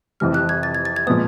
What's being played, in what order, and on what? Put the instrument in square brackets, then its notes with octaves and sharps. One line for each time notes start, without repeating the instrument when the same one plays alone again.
[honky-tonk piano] F2 C3 E3 G3 [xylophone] F6
[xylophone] F#6
G#6
A6
G#6
A6
G#6
[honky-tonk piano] A#2 F3 G#3 B3 [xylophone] D#6